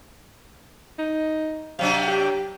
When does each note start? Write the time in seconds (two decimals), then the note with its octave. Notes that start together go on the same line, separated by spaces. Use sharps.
0.98 D#4
1.79 C3 F#3 D4 F5
2.08 G4